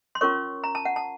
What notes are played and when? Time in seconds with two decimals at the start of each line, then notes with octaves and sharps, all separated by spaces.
0.15 C6
0.21 C#4 F4 A#4 C#5 C#6
0.64 A#5
0.75 A5
0.85 F#5
0.96 A5